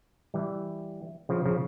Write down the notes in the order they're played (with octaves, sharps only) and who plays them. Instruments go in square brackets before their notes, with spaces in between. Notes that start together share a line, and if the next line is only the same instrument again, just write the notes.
[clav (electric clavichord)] E3 G3
C#3 F3
C#3 F3